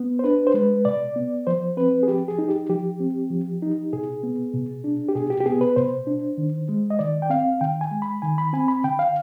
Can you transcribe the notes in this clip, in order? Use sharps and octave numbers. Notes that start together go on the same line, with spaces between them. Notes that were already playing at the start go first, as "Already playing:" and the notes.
Already playing: B3
C5
D4 B4
C5
G#3 B4
B2 D5
B3
F3 C5
C4 B4
G#4
F3 G4
G#4
D#4
G4
F3 G4
C4
F3
D#4
B2 G#4
B3
B2
D4
G4
B2 G#4
G4
G4
B3 G#4
B4
B2 C5
D4
D#3
G#3
D#5
D#3 D5
G5
C4 F5
D#3 G5
G#5
G#3
B5
D#3 G#5
B5
C4 G#5
B5
D3 G5
F5